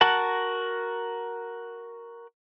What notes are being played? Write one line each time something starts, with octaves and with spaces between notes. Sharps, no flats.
F#4 A#4 F#5 A5